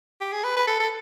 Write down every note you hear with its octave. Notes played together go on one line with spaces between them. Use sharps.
G4
G#4
B4
B4
A4
A4